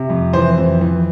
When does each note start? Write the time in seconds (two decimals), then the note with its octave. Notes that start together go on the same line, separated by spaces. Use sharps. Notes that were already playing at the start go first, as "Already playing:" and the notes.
Already playing: C3
0.10 F2
0.33 E3 C5
0.58 F2
0.81 E3